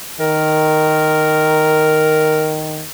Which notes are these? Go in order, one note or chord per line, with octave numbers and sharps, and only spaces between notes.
D#3 A#4